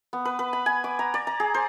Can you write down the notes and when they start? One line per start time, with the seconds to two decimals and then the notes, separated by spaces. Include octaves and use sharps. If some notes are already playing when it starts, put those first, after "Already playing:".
0.13 B3
0.25 B4
0.39 B4
0.53 B5
0.66 G#5
0.84 D6
0.99 A#5
1.14 D5
1.27 A#5
1.40 G#4
1.54 C5